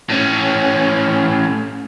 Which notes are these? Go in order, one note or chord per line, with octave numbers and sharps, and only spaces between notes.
A2 C#4